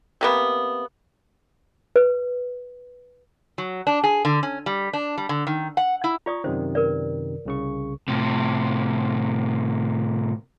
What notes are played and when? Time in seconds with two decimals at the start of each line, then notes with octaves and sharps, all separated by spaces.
0.21 C3 A#3 B3
1.96 B4
3.58 F#3
3.87 D4
4.04 G#4
4.25 D3
4.43 C#4
4.66 G3
4.93 D4
5.18 G3
5.29 D3
5.47 D#3
5.77 F#5
6.04 E4
6.26 F4 D5 A#5 C#6 D#6
6.44 F#2 C3 D#3 C5
6.75 A#4 B4 D5
7.45 C2 C#3 C#6
8.08 A2 C3